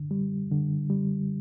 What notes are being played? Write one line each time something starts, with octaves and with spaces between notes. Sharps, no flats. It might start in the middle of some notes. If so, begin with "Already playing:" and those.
Already playing: D3
G3
D3
G3